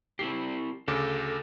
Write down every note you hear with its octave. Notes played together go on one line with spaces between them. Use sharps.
C4 E4 G4 C7
D2 C#3 A4 D6